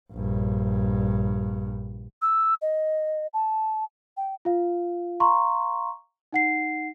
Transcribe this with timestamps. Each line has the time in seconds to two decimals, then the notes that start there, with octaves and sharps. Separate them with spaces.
0.12 A#1 G2
2.22 E6
2.62 D#5
3.34 A5
4.17 G5
4.45 F4 F5
5.20 F5 A#5 C6 C#6
6.33 D#4 F#5 C7